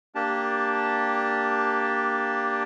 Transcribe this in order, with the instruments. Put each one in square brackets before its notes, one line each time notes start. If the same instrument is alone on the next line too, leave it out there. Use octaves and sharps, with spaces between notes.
[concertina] A#3 D4 G4 A5